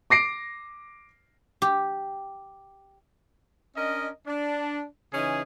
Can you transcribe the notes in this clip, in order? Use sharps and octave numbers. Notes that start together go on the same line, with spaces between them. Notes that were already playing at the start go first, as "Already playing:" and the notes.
D6 A#6 C7 D7
G4
C#4 D4 A#4 D#5
D4
C#3 E3 C#4 D#4 G#4